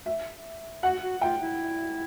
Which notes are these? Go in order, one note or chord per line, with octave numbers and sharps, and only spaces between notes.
E5
F#4 F#5
F#4
F4 G5
E4